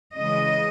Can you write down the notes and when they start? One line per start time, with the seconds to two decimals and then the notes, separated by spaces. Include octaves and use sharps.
0.15 C#3 E3 G#3 D#5